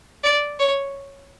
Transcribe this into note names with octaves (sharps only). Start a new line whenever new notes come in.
D5
C#5